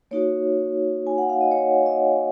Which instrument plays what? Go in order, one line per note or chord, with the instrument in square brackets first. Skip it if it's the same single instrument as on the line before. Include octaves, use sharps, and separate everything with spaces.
[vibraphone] A#3 D#4 F#4 C#5
G#5
F#5
F5
D#5
C#5
D#5